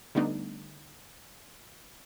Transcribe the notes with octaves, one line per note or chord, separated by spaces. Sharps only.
D3 G3 A3 B3 D4 D#4